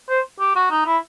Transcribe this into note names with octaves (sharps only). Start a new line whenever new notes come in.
C5
G4
F#4
D#4
E4